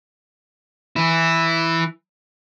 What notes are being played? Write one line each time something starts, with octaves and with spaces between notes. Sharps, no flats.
E3 E4